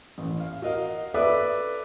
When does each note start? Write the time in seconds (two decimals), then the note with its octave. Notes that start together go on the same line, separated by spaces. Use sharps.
0.18 A1
0.40 F5
0.62 F#4 A#4 D#5 F5
1.14 A4 B4 D5 E5 D6